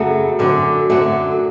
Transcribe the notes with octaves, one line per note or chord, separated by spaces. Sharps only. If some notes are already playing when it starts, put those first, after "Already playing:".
Already playing: F#2 C#3 F#3 A3
F#2 D3 F#3
F#2 D3 F#3 A3